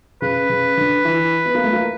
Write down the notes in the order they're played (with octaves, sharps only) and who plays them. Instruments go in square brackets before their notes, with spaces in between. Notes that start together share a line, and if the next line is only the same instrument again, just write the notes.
[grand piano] C#3 [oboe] B4
[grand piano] C#3
D3
E3
B3
A#3
A3
A#3